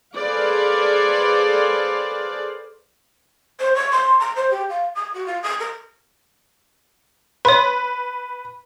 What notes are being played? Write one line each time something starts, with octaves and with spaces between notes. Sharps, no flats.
G#4 A4 B4 C5 D5 F5
C5
C#5
C6
A#5
C5
G4
F5
D#6
F#4
F4
D#6
A#4
B4 C#5 C6